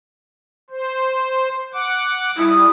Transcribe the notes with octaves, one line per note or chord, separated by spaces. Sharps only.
C5
F#5 D6
G3 E4 D#6